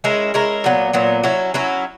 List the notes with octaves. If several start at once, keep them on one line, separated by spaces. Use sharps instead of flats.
G#3 C#4 E4 A#4
G#3 C#4 E4 A#4
A#2 F#3 B3
A#2 F#3 B3
F#3 C#4 E4
F#3 C#4 E4